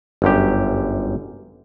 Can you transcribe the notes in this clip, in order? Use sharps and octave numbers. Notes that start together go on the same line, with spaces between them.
G1 F#2 G4